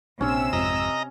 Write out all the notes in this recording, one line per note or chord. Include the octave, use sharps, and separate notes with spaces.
A#1 C3 C#4 D4 E6
G#1 F2 D#5 A#5